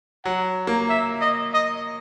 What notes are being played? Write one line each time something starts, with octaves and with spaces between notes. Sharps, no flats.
F#3 F#5
A#3
E5
D#5
D#5